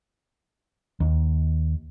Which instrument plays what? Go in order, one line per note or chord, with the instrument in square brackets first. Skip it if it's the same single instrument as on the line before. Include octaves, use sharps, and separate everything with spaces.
[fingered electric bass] D#2